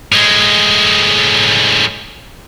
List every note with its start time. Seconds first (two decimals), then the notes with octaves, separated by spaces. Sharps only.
0.12 A2 G#3